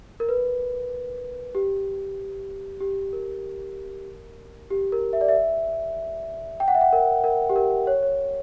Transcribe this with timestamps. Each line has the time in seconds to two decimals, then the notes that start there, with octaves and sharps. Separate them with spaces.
0.20 A#4
0.29 B4
1.55 G4
2.80 G4
3.13 A#4
4.71 G4
4.92 A#4
5.13 E5
5.21 D5
5.28 E5
6.60 G5
6.68 F#5
6.75 E5
6.81 F#5
6.93 A#4
7.24 A#4
7.50 G4
7.56 A#4
7.87 C#5
8.03 C#5